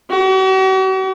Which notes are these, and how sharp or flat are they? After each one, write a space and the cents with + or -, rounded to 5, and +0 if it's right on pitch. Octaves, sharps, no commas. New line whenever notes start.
F#4 +45